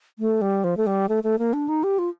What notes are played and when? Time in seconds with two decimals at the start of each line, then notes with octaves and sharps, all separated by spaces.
0.19 A3
0.42 G3
0.64 F3
0.77 A3
0.87 G3
1.09 A3
1.24 A3
1.39 A#3
1.53 D4
1.69 D#4
1.84 G4
1.99 F4